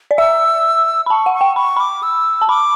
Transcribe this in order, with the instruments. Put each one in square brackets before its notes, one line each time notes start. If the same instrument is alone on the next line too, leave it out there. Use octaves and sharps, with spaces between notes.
[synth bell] D5
[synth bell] E5 [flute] E6
[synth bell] B5
[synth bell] A5 [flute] C#6
[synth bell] F#5
[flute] C#6
[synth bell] G5
[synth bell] B5 [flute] C#6
[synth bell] B5 [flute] D6
[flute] E6
[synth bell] A5
[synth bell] B5 [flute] D6